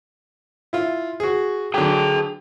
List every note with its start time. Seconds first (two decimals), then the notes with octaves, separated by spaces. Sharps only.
0.73 E4 F4
1.20 F#4 G#4
1.74 D3 F#3 G#4 G5